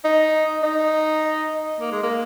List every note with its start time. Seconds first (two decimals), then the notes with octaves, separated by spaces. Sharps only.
0.04 D#4
0.63 D#4
1.80 A#3
1.92 G#3
2.03 A#3